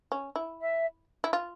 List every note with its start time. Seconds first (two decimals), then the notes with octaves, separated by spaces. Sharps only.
0.12 C#4
0.36 E4
0.60 E5
1.24 E4
1.33 F4